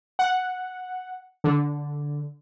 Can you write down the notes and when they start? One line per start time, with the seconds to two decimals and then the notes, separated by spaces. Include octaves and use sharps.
0.19 F#5
1.44 D3